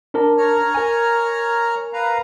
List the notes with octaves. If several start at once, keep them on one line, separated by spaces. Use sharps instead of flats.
D4 A#4 A5
C#5 A#5 F6
A#4 G#5
B4 F5 A#5